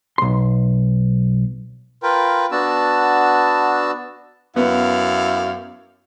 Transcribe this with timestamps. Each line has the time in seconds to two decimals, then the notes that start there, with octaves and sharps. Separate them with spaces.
0.18 B1 C6
2.03 F4 A#4 B4 G5
2.52 B3 D4 F#4 A5 E6
4.56 F#2 B3 E4 F5